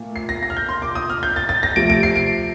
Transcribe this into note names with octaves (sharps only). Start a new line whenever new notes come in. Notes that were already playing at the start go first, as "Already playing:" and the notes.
Already playing: A#2 A3
C7
A#6
A#6
F6
G6
C6
D6
D#6
F6
G6
A6
A6
A#6
C3 F3 A3 D7
D7
C7
D7